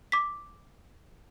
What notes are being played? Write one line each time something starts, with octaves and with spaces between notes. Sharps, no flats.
D6 B6